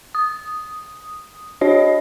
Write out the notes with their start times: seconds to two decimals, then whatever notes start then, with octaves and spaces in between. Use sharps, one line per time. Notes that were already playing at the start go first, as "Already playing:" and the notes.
0.15 D#6
1.61 D4 F#4 C#5 D#5